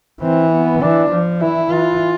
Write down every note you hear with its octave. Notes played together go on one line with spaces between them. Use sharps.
E3 C4
B3
E3 D4
F3
E3 E4
E3 F4